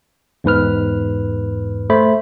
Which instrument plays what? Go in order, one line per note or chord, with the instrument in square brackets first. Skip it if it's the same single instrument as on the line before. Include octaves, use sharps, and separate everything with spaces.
[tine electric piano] E2 G#2 B4 F6
A3 C5 B5